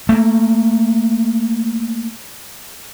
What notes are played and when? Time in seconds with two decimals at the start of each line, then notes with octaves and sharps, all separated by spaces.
0.09 A3 A#3